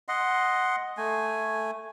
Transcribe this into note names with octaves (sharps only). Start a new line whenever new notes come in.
D#5 F#5 C6
A3 G#5